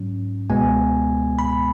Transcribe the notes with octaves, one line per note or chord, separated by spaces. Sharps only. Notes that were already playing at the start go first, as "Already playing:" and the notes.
Already playing: G#2 F#3 C#4
C#2 B2 G#3 B3 G#5
B5